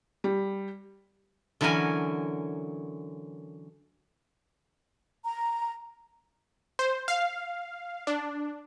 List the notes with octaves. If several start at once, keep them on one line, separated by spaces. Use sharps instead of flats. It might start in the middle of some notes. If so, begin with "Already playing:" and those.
G3
D3 E3 F#3 C#4 A#4 G#5
A#5
C5
F5
D4